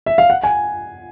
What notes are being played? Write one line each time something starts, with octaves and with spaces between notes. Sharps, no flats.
E5
F5
F#5
G#5